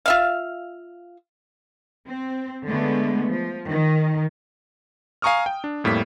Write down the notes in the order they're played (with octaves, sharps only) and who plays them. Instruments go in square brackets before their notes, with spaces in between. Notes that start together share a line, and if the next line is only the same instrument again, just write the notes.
[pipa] F4 E5 F5
[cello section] C4
D3 G#3 A3 B3
F3
D#3
[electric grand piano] F5 G#5 A#5 C#6 D#6 F6
G5
D4
F2 A2 G3 A#3 B6